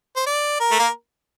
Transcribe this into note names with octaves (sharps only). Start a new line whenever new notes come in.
C5
D5
A#4
A3
A#3